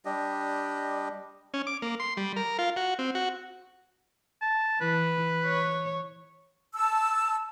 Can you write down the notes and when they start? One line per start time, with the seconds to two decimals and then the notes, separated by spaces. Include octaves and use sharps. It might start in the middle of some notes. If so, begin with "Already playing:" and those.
0.05 G3 D4 G4 D#5
1.54 C#4
1.67 D6
1.82 A#3
2.00 C6
2.17 G3
2.36 A#4
2.59 F4
2.76 F#4
2.99 C4
3.15 F#4
4.42 A5
4.81 E3 B4
5.45 C#5
6.74 A5 E6